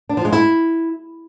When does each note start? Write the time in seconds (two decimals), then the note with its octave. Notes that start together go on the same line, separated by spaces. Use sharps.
0.09 D4
0.17 F3
0.25 G#3
0.32 E4